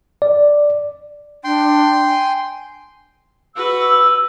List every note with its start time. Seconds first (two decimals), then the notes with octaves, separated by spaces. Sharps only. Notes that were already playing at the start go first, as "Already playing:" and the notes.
0.22 D5
1.44 D4 G5 C6
2.08 G#5
3.56 F#4 B4 E6